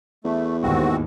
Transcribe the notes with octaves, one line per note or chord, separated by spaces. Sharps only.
E2 A3
D#2 G#2 C4 F#4